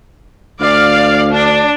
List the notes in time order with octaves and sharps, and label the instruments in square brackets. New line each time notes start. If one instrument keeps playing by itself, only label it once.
[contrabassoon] D2 [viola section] D5 F5
[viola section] D4